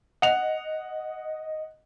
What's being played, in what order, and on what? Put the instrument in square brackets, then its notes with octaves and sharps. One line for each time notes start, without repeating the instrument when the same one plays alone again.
[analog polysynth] D#5 [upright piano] F#5 F7